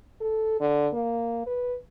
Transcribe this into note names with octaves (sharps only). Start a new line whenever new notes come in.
A4
D3
A#3
B4